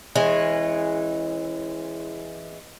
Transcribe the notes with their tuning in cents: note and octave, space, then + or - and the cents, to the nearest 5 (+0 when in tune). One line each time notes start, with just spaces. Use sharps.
E3 +0 G#3 -10 C#4 -35